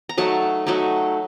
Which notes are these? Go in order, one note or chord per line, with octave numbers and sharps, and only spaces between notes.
A#5
F#3 A3 D#4 A5
F#3 A3 D#4